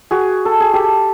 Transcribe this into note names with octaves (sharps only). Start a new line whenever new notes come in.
F#4 G#4
A4
G#4
G4 A4